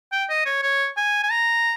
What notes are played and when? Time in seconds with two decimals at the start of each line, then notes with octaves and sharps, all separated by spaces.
0.12 G5
0.30 D#5
0.46 C#5
0.63 C#5
0.97 G#5
1.23 G#5
1.30 A#5